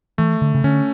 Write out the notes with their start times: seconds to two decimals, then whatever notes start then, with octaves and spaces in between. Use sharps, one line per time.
0.18 E3 A3
0.42 D3
0.55 C#3
0.64 D3 C#4